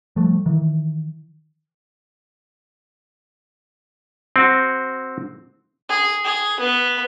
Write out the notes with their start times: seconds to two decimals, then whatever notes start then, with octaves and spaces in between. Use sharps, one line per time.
0.16 F3 G3 A3
0.46 D#3 E3
4.36 C4 F#4
5.89 G#4
6.24 G#4
6.60 B3